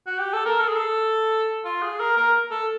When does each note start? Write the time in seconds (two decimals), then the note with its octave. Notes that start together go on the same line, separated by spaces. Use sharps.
0.07 F#4
0.19 G4
0.33 A4
0.45 A#4
0.60 A4
0.68 G#4
0.77 A4
1.65 F4
1.82 G#4
2.00 A#4
2.17 A#4
2.51 A4